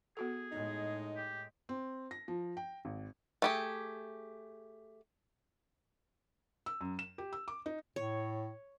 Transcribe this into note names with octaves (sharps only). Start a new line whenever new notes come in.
B3 F#4 G#4 A4
A2 G#3 D#4
G4
C4
A#6
F3
G5
G#1
A3 G4 G#4
E6
F#2
E7
G4
E6
D6
D#4
A2 C#5